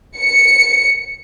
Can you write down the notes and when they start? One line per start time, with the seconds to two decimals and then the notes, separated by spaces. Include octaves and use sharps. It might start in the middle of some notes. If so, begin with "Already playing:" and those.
0.17 C#7